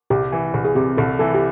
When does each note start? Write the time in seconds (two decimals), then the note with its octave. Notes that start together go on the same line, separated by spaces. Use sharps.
0.10 C2 G4
0.32 E3
0.54 C2
0.65 G#4
0.75 C3 G4
0.97 C2 A4
1.19 E3 A4
1.35 G4